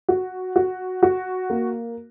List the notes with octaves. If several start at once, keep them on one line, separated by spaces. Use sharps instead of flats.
F#4
F#4
F#4
A#3